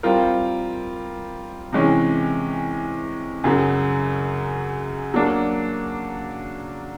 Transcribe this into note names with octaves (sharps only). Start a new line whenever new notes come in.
G3 C4 F4 A#4
C3 E3 G#3 C#4
F#2 C#3 F#3
F#3 A#3 D4